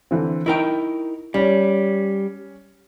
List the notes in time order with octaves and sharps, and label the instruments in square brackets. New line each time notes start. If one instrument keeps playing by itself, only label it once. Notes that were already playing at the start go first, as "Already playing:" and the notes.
[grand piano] D3 E3 C4
[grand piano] D#4 [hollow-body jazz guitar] E4 A#4 G5
[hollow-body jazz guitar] G3 [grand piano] C#4 C#5